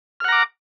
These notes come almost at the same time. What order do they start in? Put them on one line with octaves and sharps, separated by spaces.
F6 F#5 A#5 D6